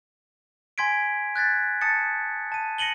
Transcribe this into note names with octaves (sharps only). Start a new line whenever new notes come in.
G#5 C6 G#6 B6 D7
F#6 G#6 A6 B6
A5 D#6 A6 C#7
A5 D#7
A#6 C#7 D#7 F#7 G7